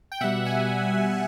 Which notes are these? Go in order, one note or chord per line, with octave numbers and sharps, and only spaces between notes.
G5
B2 G3 E5 F#5
F#5 G#5